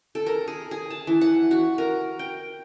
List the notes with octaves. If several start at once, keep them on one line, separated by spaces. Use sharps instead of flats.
A4
A#4
G#4
G#4
A5
E3
F#5
F#4
A#4
G5